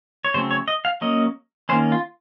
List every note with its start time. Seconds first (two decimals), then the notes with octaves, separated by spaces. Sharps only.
0.25 C#5
0.34 C#3 F#3 A3 C4 C5
0.51 C#5
0.68 D#5
0.85 F5
1.01 F#3 A#3 C#4 D#5
1.69 D#3 A#3 C#4 C5
1.92 F4